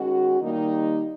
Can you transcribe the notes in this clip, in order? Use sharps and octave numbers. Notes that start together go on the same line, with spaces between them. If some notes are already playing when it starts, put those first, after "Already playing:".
Already playing: D#3 G#3 C#4 F#4
D#2 D#3 G3 A#3 D#4